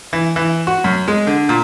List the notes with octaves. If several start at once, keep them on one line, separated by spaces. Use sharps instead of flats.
E3
E3
F#4
F#2
G#3
D3
A#2